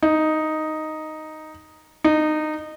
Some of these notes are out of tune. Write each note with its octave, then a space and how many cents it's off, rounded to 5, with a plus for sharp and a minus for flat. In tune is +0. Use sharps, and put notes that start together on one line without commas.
D#4 +0
D#4 -20